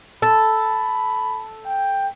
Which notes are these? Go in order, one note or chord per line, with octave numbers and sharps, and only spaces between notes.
A4 B5
G5